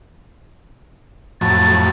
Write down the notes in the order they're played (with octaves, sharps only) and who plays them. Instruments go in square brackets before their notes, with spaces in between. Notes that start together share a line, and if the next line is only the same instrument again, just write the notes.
[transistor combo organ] F2 A2 F#3 [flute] A6